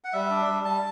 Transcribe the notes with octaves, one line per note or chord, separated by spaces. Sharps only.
F#5
G3 E5
D4
G3
G3 A5